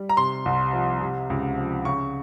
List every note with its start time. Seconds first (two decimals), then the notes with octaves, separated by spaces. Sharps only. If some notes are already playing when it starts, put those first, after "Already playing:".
Already playing: G3
0.09 A#5
0.17 C3 C6
0.46 C2
0.73 F3
1.01 C3
1.30 C#2
1.57 F3
1.85 C#3 C#6